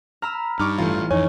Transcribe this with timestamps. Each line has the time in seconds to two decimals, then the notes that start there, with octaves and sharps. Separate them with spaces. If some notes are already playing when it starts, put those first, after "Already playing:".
0.22 A#5 B5 E6 F6
0.59 G2 D#4 C#6 D6 F6
0.78 A1 A3 F4
1.11 F2 D#4 C#5 G#5